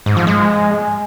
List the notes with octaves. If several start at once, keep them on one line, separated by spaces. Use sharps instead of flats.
G#2
F3
G#3